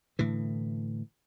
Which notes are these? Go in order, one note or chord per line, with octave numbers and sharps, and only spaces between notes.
A2 D3 E3